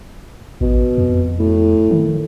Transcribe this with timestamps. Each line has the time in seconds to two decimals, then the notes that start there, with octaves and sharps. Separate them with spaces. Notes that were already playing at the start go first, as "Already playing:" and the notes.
0.61 A1 B2
0.98 F2
1.39 A2
1.91 D#3